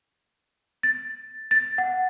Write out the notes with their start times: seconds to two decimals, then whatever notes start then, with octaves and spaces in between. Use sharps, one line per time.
0.83 A6
1.51 A6
1.78 F#5